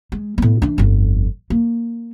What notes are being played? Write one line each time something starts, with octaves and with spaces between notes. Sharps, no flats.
G#3
A2 B3
E3 D4
G1 F2
A#3